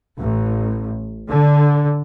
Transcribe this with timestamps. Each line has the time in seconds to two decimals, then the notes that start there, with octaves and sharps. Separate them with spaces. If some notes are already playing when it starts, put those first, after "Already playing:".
0.20 A1
1.29 D3